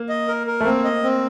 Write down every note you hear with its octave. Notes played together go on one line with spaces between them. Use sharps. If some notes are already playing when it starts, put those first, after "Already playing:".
Already playing: A#3
D#5
A#4
A#4
A3
A#3 C4
D#5
C4